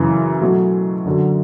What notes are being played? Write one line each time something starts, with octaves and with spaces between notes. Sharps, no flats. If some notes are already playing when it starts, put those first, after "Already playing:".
Already playing: F#2 C#3 E3
B2 F#3 A3
F#2 D3 F#3